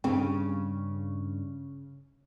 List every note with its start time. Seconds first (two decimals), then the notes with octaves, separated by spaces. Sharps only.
0.04 G2 C#3 G3 C4